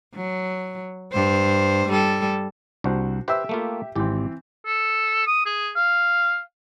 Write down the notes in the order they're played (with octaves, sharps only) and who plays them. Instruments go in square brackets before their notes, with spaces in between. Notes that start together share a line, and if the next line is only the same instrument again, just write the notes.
[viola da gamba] F#3
G2 C5
G3 A4
[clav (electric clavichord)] C2 [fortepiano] D4 F#4 C5
[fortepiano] G4 E5 E6 [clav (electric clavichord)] B4 C5
[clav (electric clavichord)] A3 A#3 F4
[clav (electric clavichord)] G#1 G4 [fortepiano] E3 C4
[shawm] A4
D#6
G#4
F5